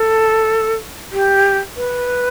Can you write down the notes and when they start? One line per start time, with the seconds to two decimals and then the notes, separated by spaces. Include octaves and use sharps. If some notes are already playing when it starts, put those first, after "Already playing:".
Already playing: A4
1.12 G4
1.76 B4